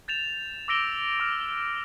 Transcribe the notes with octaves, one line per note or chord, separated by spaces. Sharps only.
G6 A6 E7 F7
D6 E6 A#6 D7 G7
D6 F6